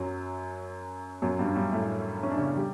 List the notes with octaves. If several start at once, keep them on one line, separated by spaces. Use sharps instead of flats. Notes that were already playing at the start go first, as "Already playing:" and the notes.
Already playing: F#2 F#3
F#2 F#3
G2 G3
G2 G3
A2 A3
C#4
D4
C#3 C#4
G3 G4